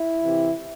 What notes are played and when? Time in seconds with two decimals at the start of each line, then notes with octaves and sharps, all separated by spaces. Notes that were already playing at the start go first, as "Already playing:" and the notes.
Already playing: E4
0.23 C3 E3